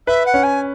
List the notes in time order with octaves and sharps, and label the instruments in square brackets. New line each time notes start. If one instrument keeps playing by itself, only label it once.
[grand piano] B4 [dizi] E5
[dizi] F#5
[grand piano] C#4
[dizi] G#5